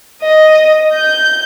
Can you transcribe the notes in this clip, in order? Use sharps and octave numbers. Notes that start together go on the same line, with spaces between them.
D#5
G6